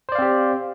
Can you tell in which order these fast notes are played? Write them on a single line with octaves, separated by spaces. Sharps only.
C5 D5 F5 C4 G4